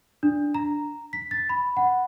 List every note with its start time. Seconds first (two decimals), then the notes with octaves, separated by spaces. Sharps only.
0.23 D4
0.54 A#5
1.13 B6
1.31 A6
1.49 B5
1.77 F#5